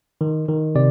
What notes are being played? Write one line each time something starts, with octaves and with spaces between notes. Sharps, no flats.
D#3
D#3
C3 D5